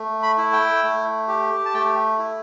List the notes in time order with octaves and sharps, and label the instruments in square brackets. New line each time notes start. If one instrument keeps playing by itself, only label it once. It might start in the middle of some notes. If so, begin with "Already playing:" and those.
Already playing: [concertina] A3
B5
E4
G5
A3
G4
A5
A3 G5
E4